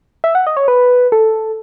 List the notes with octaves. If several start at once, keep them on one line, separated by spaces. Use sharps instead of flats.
E5
F#5
D#5
C#5
B4
A4